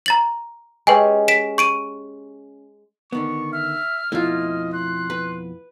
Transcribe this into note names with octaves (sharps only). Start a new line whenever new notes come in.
A#5 A6 F#7
G#3 C#4 G4 B4 G5 G#5
B6 D7 E7
C#6 D7 D#7
D3 D#3 B3 C#6
E5 F6
F2 B2 A3 E4 F4 D#5
C6 F#6
B4